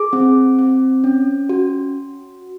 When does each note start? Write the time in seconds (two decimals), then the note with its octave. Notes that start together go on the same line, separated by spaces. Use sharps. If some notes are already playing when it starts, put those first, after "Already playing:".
Already playing: G#4 D6
0.13 C4
0.59 C4
1.04 C#4
1.49 F#4